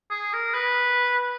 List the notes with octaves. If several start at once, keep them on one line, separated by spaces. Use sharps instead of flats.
G#4
A#4
B4